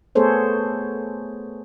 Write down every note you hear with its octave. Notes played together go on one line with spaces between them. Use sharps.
A3 B3 G#4 A4 C5 C#5